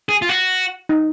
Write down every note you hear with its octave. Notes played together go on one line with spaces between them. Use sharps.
G#4
F4
F#4
D#4